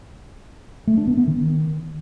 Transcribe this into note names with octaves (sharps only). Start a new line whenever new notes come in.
A3
D4
B3
B3
D#3